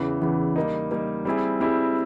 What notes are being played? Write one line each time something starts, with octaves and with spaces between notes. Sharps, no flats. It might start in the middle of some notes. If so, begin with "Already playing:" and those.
Already playing: E2 C#3 E3
E2 C#3 E3
G3 A#3 D#4
G3 A#3 D#4
G3 C4 E4 G#4
G3 C4 E4 G#4